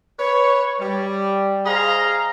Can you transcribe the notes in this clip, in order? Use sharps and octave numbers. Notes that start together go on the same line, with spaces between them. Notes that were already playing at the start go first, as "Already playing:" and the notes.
B4 C#5
G3
G#4 C5 D#5 F5 A#5